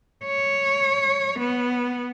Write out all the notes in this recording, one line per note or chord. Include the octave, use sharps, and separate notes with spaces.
C#5
B3